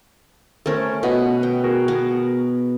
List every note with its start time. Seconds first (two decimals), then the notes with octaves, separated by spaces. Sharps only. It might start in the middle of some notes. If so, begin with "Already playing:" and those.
0.66 A3 C#4 A4 A#4 C5
1.03 B2 B4 D#5 F#5
1.43 G5
1.64 F#4 G#4 A#4
1.88 B3